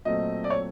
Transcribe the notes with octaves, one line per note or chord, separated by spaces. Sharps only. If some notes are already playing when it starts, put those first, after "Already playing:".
A#2 F#3 A3 C4 D#5
D5
C#5